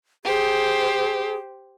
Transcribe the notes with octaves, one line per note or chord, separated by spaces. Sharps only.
G4 G#4 C5